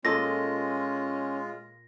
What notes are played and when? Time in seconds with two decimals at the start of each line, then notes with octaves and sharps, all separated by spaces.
0.05 A#2 G#3 C#4 F4 A4 D#5 A#6